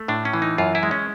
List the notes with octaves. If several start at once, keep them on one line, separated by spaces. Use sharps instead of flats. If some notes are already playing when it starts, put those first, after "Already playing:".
Already playing: A3
A2 D4
C#4
E3
D#4
F#2 F4
E4
G#3
C#4